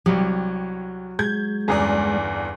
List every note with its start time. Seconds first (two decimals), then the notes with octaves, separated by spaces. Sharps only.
0.06 C2 F#3 G4
1.19 G#3 G6 G#6
1.68 G1 E2 C#4 G#4 D5 A#5